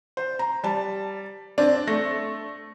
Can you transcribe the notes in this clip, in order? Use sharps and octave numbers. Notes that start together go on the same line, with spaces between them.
C5
A#5
G3 A5
C4 D4
A3 A#6